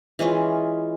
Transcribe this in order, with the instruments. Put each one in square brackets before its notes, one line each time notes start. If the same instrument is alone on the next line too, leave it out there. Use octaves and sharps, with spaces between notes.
[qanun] E3 G#3 C#4 F4